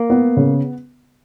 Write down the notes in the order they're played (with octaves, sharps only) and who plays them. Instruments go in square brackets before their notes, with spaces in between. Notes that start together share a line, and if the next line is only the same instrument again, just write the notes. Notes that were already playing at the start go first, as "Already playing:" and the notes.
Already playing: [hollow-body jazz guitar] A#3
[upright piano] B3
C#3